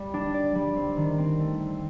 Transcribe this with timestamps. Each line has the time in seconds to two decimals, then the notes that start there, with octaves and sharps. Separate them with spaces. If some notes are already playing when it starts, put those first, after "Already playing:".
Already playing: G3
0.14 D4
0.34 D5
0.55 G3
0.76 C4
0.97 D#3
1.18 C4
1.40 A3
1.59 C4